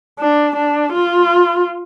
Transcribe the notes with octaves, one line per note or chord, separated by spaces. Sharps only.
D4
D4
F4